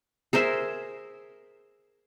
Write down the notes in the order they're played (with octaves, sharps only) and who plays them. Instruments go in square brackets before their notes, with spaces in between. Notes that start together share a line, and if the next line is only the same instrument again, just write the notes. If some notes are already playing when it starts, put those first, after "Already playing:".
[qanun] G#4 A#4 C5 E5